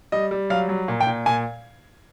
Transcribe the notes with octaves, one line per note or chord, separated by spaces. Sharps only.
G3 D#5
G3
F#3 F5
F#3
A#2
G5
A#2
A#2 G#5